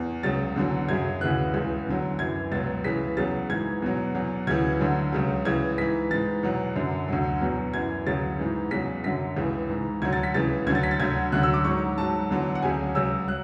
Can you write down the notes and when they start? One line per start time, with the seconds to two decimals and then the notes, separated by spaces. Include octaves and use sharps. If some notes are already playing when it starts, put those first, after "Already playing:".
Already playing: E2
0.23 C#2 C#3 F#3 A6
0.56 E2 D3 F#3
0.89 F#2 C#3 F#3 G#6
1.21 D2 C#3 E3 F#6
1.54 C#2 C#3 E3
1.87 E2 D3 F#3
2.19 F#2 E3 G#6
2.52 C#2 B2 F#3 A6
2.84 C#2 C#3 E3 B6
3.17 E2 C#3 F#3 A6
3.50 G#2 E3 G#6
3.82 E2 B2 F#3
4.15 E2 B2 F#3
4.47 D2 C#3 E3 G#6
4.80 D2 D3 F#3
5.13 C#2 C#3 F#3
5.45 C#2 C#3 E3 G#6
5.78 G#2 E3 B6
6.11 G#2 E3 A6
6.43 E2 B2 F#3
6.75 F#2 D3 F#3
7.08 D2 D3 F#3
7.41 E2 B2 F#3
7.74 F#2 E3 G#6
8.06 D2 C#3 F#3 A6
8.39 G#2 E3
8.71 E2 C#3 F#3 B6
9.04 F#2 D3 F#3 B6
9.36 C#2 C#3 E3
9.69 G#2 E3
10.02 D2 D3 F#3 G#6
10.13 A6
10.23 B6
10.34 C#2 C#3 E3 A6
10.66 D2 D3 F#3 G#6
10.75 A6
10.83 B6
10.91 A6
10.99 D2 D3 F#3 G#6
11.32 D2 D3 F#3 F#6
11.43 E6
11.54 D6
11.65 G#2 F#3 C#6
11.97 G#2 F#3 A5
12.30 E2 D3 F#3
12.55 F#5
12.62 D2 C#3 F#3 G#5
12.95 C#2 C#3 F#3 E6
13.28 F#3 F#6